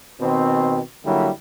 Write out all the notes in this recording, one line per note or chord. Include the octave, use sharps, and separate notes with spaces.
B2 D#3 C4
D3 F#3 G3 A#3 E4